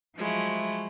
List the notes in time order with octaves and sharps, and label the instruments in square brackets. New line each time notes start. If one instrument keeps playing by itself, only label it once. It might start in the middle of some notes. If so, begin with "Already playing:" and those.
[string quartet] F3 F#3 G#3 A3 E4